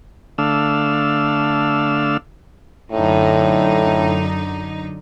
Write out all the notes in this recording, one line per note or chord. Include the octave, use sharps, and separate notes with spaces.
D3 A3 D4 F5 E6
F#2 A2 D3 D#4